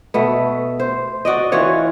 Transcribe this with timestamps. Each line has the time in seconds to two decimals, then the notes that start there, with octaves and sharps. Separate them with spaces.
0.14 B2 A3 B3
0.80 C5
1.25 F#4 D5 D#5
1.52 E3 F4 F#4 C#5